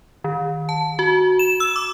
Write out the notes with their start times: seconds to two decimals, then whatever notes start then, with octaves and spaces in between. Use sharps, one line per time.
0.24 D#3
0.69 A5
0.99 F#4
1.39 E7
1.60 E6
1.76 D6